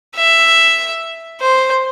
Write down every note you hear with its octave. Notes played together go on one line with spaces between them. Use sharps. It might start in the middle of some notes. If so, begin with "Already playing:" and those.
E5
C5